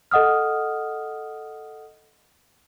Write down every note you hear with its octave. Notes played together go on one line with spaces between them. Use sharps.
A4 D#5 F#5 D#6 F6